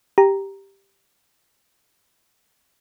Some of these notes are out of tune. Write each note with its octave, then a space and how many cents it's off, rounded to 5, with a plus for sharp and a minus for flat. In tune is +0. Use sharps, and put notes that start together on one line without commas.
G4 +0 A#5 +0